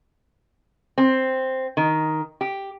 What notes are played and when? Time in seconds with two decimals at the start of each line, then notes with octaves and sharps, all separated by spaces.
0.98 C4
1.77 D#3
2.41 G4